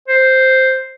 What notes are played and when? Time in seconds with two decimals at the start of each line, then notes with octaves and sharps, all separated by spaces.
0.08 C5